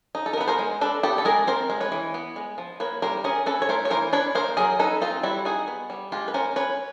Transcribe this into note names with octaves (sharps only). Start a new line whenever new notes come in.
D#4
A4
A#4
B3 B4
A#4 C5
G#3
D4 A4 B4
B3 G4 A4
A4
G#3 G#4 A#4
C4 A#4 C5
G#3
B4 C#5
E3
B3
G#3
F3
A#3 B4 C#5
G3 A#4 C5
C#4 G#4 A#4
C#4 A4 B4
C#5
A3 A#4 C5
C#5
E3 A#4 C5
D4 B4 C#5
A#3 A#4 C5
F#3 G#4 A#4
D#4 A4 B4
C4 D#4 F4
G3 E4 F#4
D#4 F#4 G#4
B3
G3
G#3 F4 G4
B4
C#4 A#4 C5
C#4 B4 C#5